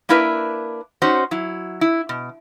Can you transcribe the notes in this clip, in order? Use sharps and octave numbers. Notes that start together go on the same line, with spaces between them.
A#3 D4 E4 A#4 B4 E5
C#4 D#4 F#4 C5
F#3 E4
E4
B2